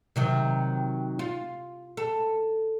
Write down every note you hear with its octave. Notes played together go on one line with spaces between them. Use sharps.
C3 D#3 F#3
F4
A4